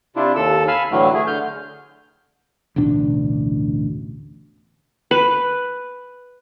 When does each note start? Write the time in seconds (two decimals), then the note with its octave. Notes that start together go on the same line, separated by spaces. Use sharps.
0.16 C3 D4 E4 F4
0.36 D#2 A4 E6
0.68 F5 G#5 B5 E6 F6
0.91 A2 D3 E3 F#3 A3
1.14 A3 G#4
1.27 D3 F6 G6
2.76 A1 D2 B2 D4
5.11 B4